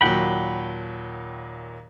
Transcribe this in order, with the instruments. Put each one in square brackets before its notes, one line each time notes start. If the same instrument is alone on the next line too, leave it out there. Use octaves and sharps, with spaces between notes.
[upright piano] D#2 A#2 F#3 [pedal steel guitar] F#5 G5 B5